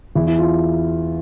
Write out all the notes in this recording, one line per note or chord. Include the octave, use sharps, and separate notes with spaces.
E2 E4
E4
F4